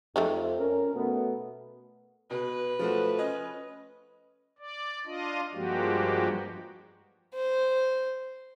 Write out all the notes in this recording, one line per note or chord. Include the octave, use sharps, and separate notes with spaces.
F2 A3 C4 D#4
C#4 A#4
B2 A3 B3
B2 B4
F3 A3 F#4
C#4 D#5
D5
D4 F4 D#5
G2 F3 G#3 A#3 F#4 G4
C5